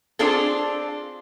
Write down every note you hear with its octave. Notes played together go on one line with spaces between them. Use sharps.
C4 D4 F4 G#4 A4